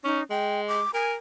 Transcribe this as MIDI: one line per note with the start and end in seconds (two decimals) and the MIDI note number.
0.04 0.20 61
0.04 0.24 63
0.30 0.82 56
0.30 0.61 79
0.68 0.91 86
0.94 1.16 70
0.94 1.11 80